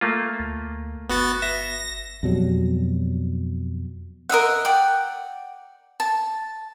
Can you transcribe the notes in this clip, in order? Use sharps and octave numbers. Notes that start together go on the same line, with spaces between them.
A3 A#3 F4
D2
G1 B3 F#4 A6
E5 A#6
F2 B2 F#3 G3
A#4 D#5 E5 F#5
D5 F#5 G5
A5